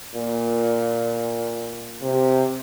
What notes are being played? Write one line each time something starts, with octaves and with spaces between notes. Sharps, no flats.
A#2
C3